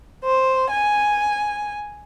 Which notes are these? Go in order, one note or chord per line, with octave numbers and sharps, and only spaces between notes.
C5
G#5